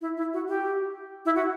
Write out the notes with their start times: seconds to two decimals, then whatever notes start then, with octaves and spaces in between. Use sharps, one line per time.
0.01 E4
0.17 E4
0.33 F#4
0.48 G4
1.25 E4
1.35 F#4